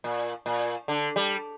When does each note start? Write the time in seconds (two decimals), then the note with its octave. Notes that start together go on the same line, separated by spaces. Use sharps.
0.04 A#2
0.46 A#2
0.88 D3
1.16 G3